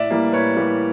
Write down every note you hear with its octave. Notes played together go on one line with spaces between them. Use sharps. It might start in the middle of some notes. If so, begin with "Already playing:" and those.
Already playing: A2 D5 E5
E3 G3 A#3
A2 B4 C#5
E3 G3 A#3